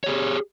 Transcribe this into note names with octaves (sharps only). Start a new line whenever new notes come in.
G4 G#4 C#5